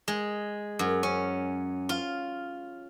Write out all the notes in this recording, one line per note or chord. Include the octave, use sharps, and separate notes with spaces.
G#3
F#2
C#4
F4